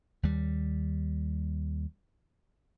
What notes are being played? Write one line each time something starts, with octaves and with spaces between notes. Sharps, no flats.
D#2 G3